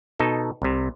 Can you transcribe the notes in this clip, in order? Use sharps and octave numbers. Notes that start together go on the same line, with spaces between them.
B2 D#4 A4
C2 C3